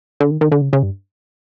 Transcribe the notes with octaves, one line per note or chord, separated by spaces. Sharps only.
D3
D#3
D#3
D3
C#3
C#3
G2